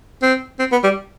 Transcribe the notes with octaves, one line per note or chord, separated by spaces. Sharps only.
C4
C4
B3
G3